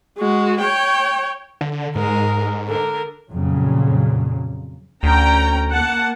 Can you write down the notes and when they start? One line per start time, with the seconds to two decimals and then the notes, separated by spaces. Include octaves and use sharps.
0.18 G#3 F#4
0.61 C#5 G5
1.61 D3
1.95 G#2 G#3 A#4
2.68 D3 A#4
3.32 F2 A#2 C#3 F#3
5.03 D2 C#4 G5 A#5
5.71 A#3 F#5 A5